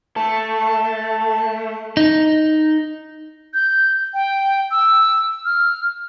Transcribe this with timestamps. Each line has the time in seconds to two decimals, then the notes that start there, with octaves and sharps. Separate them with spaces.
0.16 A3 A5
1.97 D#4
3.54 G6
4.14 G5
4.71 E6
5.45 F6